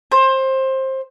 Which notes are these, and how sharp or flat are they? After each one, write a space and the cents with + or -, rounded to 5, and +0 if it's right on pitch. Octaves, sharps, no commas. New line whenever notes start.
C5 +20